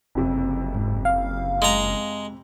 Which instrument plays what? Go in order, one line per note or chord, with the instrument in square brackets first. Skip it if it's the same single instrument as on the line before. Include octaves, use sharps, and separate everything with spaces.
[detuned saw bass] F#1 [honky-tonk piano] F2 C3
[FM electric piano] G#2
F5
[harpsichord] G#3 A#5